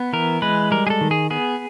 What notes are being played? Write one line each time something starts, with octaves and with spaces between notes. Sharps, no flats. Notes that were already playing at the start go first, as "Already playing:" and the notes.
Already playing: B3
E3 A#4
G#3 B4
G3 A#4
G#4
A4
D#3
G#4
B3 G#4